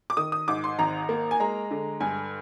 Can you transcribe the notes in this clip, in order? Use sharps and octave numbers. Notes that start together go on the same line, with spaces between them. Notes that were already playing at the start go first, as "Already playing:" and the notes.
D6
D#3 D#6
D#6
G#2 D6
C6
G#1 A#5
A#3
G#5
G#3 A#5
D3
G2 G#5